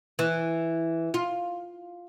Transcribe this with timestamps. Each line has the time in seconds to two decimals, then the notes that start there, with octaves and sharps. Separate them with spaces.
0.19 E3
1.14 F4